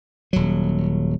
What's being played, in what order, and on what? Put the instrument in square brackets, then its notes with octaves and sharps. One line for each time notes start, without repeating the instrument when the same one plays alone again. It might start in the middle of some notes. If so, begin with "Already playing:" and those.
[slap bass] D#1 F#3